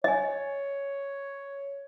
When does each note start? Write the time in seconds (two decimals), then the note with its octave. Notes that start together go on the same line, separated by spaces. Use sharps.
0.04 C#5 D#5 G#5